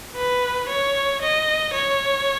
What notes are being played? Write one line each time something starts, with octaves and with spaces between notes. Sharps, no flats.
B4
C#5
D#5
C#5